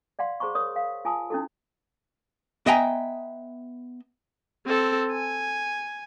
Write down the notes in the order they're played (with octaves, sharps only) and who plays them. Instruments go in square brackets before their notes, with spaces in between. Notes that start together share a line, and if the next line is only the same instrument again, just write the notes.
[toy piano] D5 F5 F#5 C6
G#4 C5 A#5 C6 C#6
A#4 C#5 D#6
F5
F4 G#5 A5 D#6
C#4 D#4 E4 F#4 A4
[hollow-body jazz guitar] B3 D#5 E5 G5 G#5 A#5
[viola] C4 A4
G#5